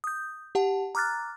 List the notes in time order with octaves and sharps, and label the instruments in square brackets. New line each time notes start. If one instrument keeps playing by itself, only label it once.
[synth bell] D#6 G6
G4 F#5 A5
A#5 D6 F6 F#6 A6